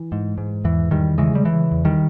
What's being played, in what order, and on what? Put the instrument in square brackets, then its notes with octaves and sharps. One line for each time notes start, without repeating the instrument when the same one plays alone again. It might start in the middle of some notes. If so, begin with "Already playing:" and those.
Already playing: [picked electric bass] E3
G#2
G#2
E2 E3
E2 D#3 G3
C#3 E3 G#3
G3
C#3 E3
E2
D#3 G3